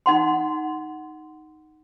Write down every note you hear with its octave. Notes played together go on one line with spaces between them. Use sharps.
D#4 F#5 C6